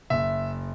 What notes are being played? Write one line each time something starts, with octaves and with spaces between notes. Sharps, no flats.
F#1 E5